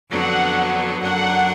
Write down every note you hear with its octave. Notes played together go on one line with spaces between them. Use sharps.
F2 D3 F#3 B3 D4 F#5
F#2 D3 F#3 A#3 D4 F#5